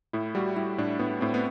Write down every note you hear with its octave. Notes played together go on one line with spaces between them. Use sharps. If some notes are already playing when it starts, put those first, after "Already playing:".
A2 E4
G3 F#4
G3 E4
A2 D4
A2 B3
A2 C4
B3